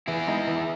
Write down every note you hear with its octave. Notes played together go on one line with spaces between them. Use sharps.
E3 E4 G#4
G#3 B3 D#4
E3